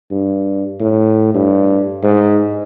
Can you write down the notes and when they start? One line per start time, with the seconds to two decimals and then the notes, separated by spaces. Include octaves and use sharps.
0.11 G2
0.81 A2
1.35 G2
2.04 G#2